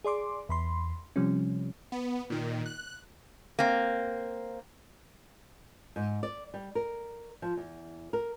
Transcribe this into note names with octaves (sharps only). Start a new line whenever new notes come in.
G#4 D5 C6 D6
E2 B5 C6
C3 F3 G3 C#4
B3
A#2 D#3
F#6
A#3 C4
G#2
D5
G3
A#4
F3
E2
A#4